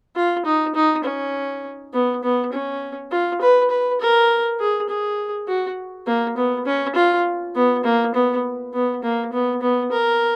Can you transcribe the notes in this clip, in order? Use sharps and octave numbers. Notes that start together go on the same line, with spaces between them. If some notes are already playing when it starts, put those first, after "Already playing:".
F4
D#4
D#4
C#4
B3
B3
C#4
F4
B4
B4
A#4
G#4
G#4
F#4
A#3
B3
C#4
F4
B3
A#3
B3
B3
A#3
B3
B3
A#4